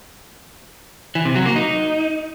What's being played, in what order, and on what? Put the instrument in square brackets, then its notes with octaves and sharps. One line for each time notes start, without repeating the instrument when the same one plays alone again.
[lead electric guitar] E3
C3
F#3
A#3
D#4